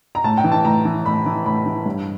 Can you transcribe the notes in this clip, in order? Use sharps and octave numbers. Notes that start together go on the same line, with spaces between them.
A#5
A2 A5
G5
E3
A5
A2 A#5
E3
A2 B5
E3
A2 B5
E3
G2